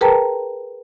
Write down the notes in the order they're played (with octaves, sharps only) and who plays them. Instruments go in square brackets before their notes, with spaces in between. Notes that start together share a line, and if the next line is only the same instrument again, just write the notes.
[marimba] G#4 A#4 B4 G5 A5 A#5